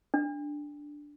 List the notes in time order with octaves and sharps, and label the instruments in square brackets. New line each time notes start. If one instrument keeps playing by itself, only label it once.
[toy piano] D4